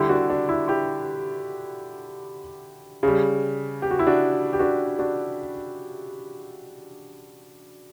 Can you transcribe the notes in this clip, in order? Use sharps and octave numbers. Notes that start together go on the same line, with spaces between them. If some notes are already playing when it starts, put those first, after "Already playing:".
Already playing: D3 G3 E4 G4
D4 F#4
D4
E4
E4 G4
C#3 G3
G4
F#4
E4
D4 F#4
G4
D4 F#4
D4 F#4